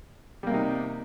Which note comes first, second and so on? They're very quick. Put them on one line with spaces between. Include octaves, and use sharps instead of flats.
G3 A#3 C3 D#4